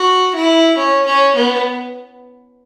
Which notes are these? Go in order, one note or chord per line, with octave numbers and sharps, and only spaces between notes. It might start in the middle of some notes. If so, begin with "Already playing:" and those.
Already playing: F#4
E4
C#4
C#4
B3